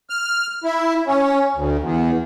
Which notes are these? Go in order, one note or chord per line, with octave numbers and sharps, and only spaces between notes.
F6
E4
C#4
D2
E2